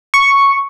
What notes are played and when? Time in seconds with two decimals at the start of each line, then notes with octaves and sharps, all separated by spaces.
0.14 C#6